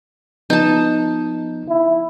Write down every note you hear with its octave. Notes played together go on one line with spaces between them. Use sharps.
F3 B3 D#4 A5 G6
E4